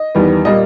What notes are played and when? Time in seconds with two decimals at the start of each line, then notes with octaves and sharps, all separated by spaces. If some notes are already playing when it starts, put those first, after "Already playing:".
Already playing: D#5
0.15 E2 D#3 G3 B3
0.45 A#2 G3 A#3 D#5